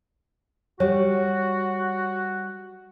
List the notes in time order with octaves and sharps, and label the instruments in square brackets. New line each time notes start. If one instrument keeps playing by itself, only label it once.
[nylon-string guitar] G3 [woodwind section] F#4 [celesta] C#5